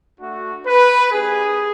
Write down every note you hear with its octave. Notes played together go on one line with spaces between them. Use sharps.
A3 D4 F#4
B4
A#3 D4 G4 G#4